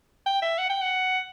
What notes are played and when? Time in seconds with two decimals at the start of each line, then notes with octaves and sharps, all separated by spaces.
0.26 G5
0.42 E5
0.58 F#5
0.70 G5
0.81 F#5